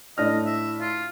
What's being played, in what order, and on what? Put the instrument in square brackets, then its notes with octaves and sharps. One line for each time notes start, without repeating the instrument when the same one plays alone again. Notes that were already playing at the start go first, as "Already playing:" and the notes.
[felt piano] A2 D4 F6 [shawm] D#5
[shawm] E5
F4